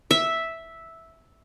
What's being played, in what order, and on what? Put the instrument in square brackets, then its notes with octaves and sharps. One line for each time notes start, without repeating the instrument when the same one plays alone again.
[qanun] E5